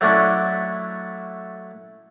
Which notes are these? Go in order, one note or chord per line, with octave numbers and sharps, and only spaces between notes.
F#3 A3 C#4 D4 E4 F#4